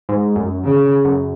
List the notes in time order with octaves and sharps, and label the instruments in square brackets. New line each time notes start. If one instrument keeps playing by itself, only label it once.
[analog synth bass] G#2
F#2
[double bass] C#3
[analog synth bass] F#2